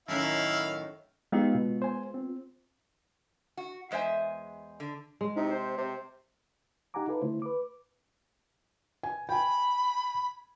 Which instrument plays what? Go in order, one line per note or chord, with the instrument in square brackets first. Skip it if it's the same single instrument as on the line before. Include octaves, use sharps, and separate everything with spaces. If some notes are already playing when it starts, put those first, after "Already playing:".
[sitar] F#2 A2 D#3 [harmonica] E4 F5
[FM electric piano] G#3 B3 F4 [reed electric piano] D#4 G4 F5
[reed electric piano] B2
C5 G#5
C4
[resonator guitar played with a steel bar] F#4
E2 G#3 C5 E5 G#5
D3
[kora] G#3
[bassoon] C3 [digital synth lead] D#4
[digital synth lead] C5
[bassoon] C3 [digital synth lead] C5
[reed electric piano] D#4 G4 F#5 G#5 A#5 D6
D#4 F4 A4 B4
D3 A3 E4 C5
B4 D6
[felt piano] G#5
[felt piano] G5 G#5 [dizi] B5